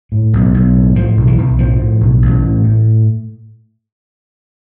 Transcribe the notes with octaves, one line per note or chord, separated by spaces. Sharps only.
A2
B1
B1
A2
A2 F3
B1
E3
B1
A2 F3
A2
B1
A1
A2
A2